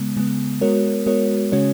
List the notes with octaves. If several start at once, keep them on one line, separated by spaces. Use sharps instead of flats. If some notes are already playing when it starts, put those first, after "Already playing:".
Already playing: C#3 G#3 B3
C#3 G#3 B3
G#3 B3 F#4 A#4 C#5
G#3 B3 F#4 A#4 C#5
C#3 G#3 C#4 F#4 C#5